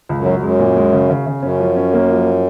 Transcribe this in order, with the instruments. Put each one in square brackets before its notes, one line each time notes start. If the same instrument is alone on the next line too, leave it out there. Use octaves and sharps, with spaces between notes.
[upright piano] C#2
[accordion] F#2
[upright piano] F#3
[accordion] F#2 [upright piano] G#3
[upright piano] A#2
G#3
C#3
C#3
C#3
[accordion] F#2 [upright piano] C#4
[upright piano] F3
C#4
A#3
F3